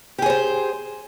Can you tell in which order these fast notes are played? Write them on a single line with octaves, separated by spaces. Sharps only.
G4 G#4 C#5 C5